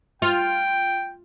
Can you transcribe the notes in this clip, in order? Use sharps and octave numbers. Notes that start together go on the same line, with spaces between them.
F4 G5